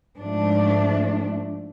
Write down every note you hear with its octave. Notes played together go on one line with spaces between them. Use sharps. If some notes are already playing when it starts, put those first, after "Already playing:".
G#2 F3 A3 D4